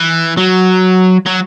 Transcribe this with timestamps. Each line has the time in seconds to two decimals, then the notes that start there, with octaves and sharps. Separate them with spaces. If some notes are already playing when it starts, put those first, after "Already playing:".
Already playing: E3
0.37 F#3
1.26 F#3